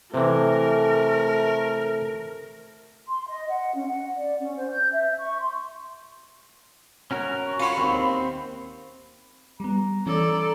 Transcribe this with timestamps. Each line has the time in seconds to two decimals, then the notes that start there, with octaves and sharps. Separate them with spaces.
0.14 C3 E3 A3 A#4
3.07 C6
3.28 D#5
3.49 F#5
3.74 C#4
3.87 F#5
4.17 D5
4.40 C#4
4.56 C5
4.71 G6
4.92 E5
5.19 C#6
5.38 C6
7.11 C#4 F#4 A#4
7.45 C#6
7.60 C#4 F4 F#4 C#5 B5
7.77 D#2 C4
9.60 G3 B3 A#5
10.06 E3 C#4 A4 D5